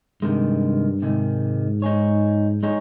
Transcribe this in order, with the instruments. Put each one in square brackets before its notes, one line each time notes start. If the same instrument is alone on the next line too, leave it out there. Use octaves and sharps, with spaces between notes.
[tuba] G2 [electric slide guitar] C3 D#3 G#3
[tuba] G#2 [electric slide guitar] C3 D#3 G#3
[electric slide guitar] G#3 D#4 G#4 C#5
G#3 D#4 G#4 C#5